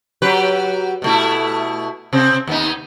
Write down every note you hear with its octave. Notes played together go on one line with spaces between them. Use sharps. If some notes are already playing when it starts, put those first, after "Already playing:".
F#3 G4 B4
B2 A3 E4
C3 C4
D#2 B3 D#4